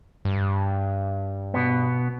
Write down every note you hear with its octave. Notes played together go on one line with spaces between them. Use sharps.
G2
B2 B3